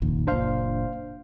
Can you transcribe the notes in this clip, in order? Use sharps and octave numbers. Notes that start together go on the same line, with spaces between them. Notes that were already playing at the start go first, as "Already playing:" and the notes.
F1 A#1 D#2
F#1 A#2 D4 C5 F5